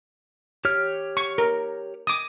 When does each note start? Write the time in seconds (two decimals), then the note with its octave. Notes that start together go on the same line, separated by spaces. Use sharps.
0.65 G4 C#5 F6
1.17 C#6
1.38 A#4
2.07 D6 D#6